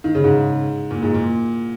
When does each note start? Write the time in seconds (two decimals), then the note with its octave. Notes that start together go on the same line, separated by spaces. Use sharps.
0.04 D#3
0.15 C#3
0.24 G#2
0.91 A#2
1.02 G#2
1.14 A#2